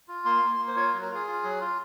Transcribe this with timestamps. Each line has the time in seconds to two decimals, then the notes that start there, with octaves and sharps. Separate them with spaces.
0.08 F4
0.25 A#3 C6
0.42 A#3
0.59 A#3
0.68 C5
0.76 F4 C#5
0.93 F#3
1.02 A#4
1.10 F4 G#4
1.27 F4
1.44 F#3
1.61 F4